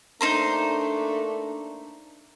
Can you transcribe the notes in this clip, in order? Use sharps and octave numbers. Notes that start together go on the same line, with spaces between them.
A3 A#3 D4 D#4 C5 A#5